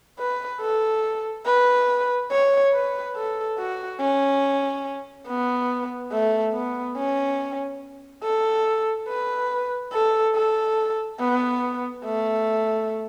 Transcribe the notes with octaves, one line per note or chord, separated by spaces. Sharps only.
B4
A4
B4
C#5
B4
A4
F#4
C#4
B3
A3
B3
C#4
A4
B4
A4
A4
B3
A3